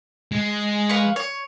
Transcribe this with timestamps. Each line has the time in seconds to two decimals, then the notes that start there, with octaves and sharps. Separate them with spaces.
0.32 G#3
0.89 B4 F5 C#6
1.16 C#5